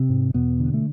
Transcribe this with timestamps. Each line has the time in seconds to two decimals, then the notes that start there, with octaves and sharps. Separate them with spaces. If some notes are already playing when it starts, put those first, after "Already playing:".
Already playing: C3 C4
0.10 G#2
0.34 E2 B2 B3
0.60 D3
0.74 A3